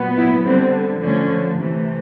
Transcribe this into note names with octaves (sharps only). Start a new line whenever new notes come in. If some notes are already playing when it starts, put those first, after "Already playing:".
Already playing: A#2 F#3 B3
E4
D3 G3 B3 C4
D3 F3 A3 C#4
C3 E3 A3